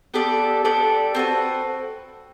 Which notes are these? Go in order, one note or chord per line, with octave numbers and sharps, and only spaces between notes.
B3 D4 G4 A4 D5
B3 D4 G4 A4 D5
C4 F#4 A4 B4